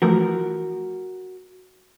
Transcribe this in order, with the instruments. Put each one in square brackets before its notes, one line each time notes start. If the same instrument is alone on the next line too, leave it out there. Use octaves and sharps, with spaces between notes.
[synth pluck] E3 F3 A3 [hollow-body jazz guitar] F#4 A#4